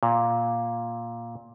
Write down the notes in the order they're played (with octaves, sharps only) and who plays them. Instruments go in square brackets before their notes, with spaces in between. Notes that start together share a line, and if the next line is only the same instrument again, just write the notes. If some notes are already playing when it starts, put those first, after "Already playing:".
[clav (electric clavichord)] A#2